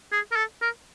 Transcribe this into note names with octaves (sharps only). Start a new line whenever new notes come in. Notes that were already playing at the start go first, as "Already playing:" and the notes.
G#4
A#4
A4
A#4